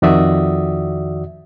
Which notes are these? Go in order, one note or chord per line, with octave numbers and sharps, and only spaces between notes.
F2 D#3 F#4 D5 E5 D#6